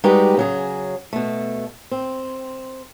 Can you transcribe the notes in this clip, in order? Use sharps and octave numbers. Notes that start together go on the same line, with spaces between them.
G3 G#3 D#4 F#4 G4 B4
C#3 F#3 G#4
B2 A3
C4